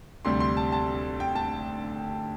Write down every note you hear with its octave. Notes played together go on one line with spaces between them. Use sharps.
D2 C3 G3 C6
C6
A5
A5
G5
A5